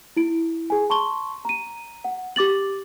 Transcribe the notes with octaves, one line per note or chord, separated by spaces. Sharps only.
E4 D7
G#4 G#5
A5 C6 C#6 G7
A#5 D#7
F#5
G4 D6 A6 F#7